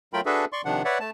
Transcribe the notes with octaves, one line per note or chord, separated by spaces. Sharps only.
F#3 A3 F4 A#4 G5 B5
D4 F#4 G#4 A4 B4 E5
D5 C6 C#6
C3 D#3 F3 D4 F#5
B4 C#5 D5 E5 F#5
A3 A5